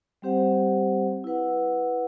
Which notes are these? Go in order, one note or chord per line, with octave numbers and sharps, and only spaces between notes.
G3 C4 G4 C5 F#5
E4 B4 F#5